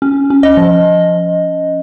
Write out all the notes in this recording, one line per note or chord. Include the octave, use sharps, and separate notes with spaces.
C#4
C#4
D#5
F3